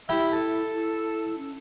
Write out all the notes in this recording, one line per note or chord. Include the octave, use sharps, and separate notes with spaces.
E4 G4 E5
E4 A4 A5
E4
C#4